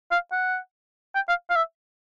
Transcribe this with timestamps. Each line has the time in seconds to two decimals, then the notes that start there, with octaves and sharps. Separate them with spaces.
0.11 F5
0.32 F#5
1.15 G5
1.29 F5
1.50 F5
1.56 E5